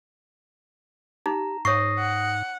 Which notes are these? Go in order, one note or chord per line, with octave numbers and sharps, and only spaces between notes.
D#4 G4 A#5
G#2 C#5 C#6 D#6 A#6 C7
F#5